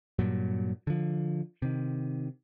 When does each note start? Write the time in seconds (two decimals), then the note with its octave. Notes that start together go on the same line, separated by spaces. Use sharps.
0.19 G2 A#2 F#3
0.87 D3 F3
1.62 C3 D#3